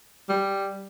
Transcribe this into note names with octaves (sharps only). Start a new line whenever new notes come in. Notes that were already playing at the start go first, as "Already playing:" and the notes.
G3